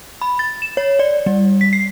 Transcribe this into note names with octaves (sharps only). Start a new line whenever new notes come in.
B5
A6
E7
C#5
D5
G3
B6
C7